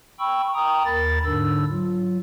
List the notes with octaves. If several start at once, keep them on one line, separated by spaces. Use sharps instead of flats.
G5 B5 C#6 E6
G5 A#5 D#6
D#2 A#4 B5 A6
G#2 D3 D4 E6
F#3 F4